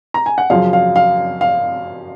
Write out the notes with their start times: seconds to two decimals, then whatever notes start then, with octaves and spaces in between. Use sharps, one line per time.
0.14 A#5
0.26 G#5
0.38 F#5
0.50 F#2 C#3 F3 F5
0.73 F5
0.96 F5
1.41 F5